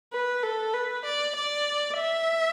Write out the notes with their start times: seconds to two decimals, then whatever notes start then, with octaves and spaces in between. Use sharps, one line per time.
0.13 B4
0.43 A4
0.74 B4
1.05 D5
1.36 D5
1.98 E5